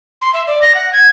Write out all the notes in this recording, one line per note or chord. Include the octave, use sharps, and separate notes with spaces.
C6
E5
D5
A#6
F#5
G#6